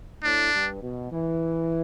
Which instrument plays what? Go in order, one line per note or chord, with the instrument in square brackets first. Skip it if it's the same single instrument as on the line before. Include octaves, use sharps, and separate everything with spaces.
[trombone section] A2 [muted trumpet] D4
[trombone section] G2
B2
E3